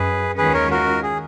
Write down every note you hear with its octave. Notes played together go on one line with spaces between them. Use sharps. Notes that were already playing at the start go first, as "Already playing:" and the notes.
Already playing: F#2 G#4 B4
D#2 D#3 G#3 C#4 F4 G#4 B4
A#4 C#5
F#4 A#4
G#4